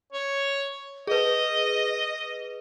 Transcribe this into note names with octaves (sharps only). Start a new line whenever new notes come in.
C#5
G#4 B4 D#5